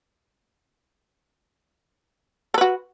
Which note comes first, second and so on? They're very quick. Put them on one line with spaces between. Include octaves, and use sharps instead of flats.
A4 B4 F#4